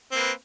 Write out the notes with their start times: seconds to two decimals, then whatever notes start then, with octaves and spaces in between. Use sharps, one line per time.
0.11 C4
0.15 A#3
0.18 B4